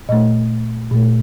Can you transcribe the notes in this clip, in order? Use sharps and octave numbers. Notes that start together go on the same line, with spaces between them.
A#2 A3 D#5
A#2 A3